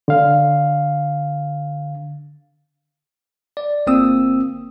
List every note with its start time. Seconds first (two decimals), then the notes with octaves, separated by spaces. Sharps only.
0.08 D3 F5
3.57 D5
3.87 G1 A#3 C4 D#6 E6